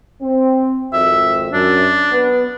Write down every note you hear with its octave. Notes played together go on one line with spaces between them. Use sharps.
C4
G#1 F2 E5
F#2 D4
B3